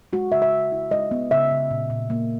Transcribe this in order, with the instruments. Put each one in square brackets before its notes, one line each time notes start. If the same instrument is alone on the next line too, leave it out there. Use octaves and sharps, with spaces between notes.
[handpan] G#3 F#4
C#3 E5
E5
G#3
E4
G#3 D#5
B3
C#3 E5
C#3
A#2
A#2
A#3